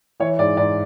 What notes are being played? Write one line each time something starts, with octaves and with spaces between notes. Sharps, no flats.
E3 C#5
G#2 D5
G#2 D5